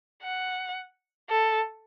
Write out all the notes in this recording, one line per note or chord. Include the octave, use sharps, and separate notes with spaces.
F#5
A4